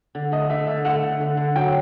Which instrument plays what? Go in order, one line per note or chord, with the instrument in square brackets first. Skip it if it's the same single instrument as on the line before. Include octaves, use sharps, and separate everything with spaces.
[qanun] D3
[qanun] A3 [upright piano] D#5
[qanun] A3 [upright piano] E5
[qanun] D3 [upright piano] E5
[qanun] A3 [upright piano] F#5
[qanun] D3
D3
D3
[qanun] F#3 [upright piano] G5